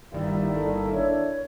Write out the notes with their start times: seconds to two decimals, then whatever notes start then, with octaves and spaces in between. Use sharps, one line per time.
0.13 G1 D#3 G3 A#3 E4 D5
0.56 A4
0.92 D4 C#5